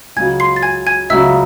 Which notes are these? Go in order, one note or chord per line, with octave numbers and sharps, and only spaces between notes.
C#2 C#3 F#3 G#5 G#6
C6 C7
A6
G#5 G#6
G#5 G#6
C#2 C#3 F#3 E5 E6